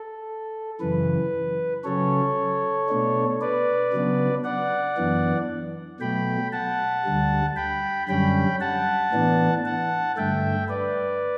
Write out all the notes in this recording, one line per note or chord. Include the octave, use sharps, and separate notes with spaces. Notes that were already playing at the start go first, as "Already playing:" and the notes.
Already playing: A4
F#2 C#3 E3 B4
C#3 F#3 C#4 A4 C#5
B2 A3 D4
B4 D5
C#3 F#3 B3 D4
D5 F#5
F#2 E3 B3 D4
B2 F#3 A3 G5 B5
F#5 A5
D2 D3 G3
G5 B5
F#2 D3 G3 C#4 G5 B5
F#5 A5
A2 E3 B3 D4
F#5 A5
G2 D3 A3 E5 G5
B4 D5